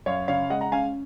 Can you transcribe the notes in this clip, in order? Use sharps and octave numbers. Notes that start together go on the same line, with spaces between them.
F#2 C#5 F5
C#3 C#5 F5
G#3 D#5 F#5
F#5 A#5
C#4 F5 G#5